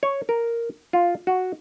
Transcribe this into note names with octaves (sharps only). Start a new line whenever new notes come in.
C#5
A#4
F4
F#4